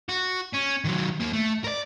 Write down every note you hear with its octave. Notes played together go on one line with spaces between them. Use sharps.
F#4
C#4
D#3 F#3
D#2 A#3
A3
A#4 D5